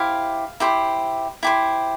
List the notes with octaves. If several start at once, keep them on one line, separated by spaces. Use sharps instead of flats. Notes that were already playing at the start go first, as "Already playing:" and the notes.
Already playing: E4 G4 C5 F5
E4 G4 C5
E4 G4 C5